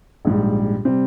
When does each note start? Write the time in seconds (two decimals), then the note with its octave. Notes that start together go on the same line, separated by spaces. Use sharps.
0.25 A#1 G#2 G3
0.85 C3 G3 C4